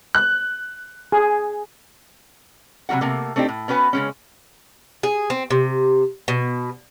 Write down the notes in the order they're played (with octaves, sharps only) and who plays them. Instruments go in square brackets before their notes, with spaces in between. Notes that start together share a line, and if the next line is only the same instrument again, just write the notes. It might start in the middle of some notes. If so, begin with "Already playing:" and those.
[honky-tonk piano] F#6
[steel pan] G#4
[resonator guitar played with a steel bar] C3 F#3 A#3 F#4 F#5
C3 A3 A#3
A3 C4 D4 D#4 G4
A2
B3 C#4 F#4 B4 G#5
C#3 G#3 C#4
[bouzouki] G#4
C4
C3
B2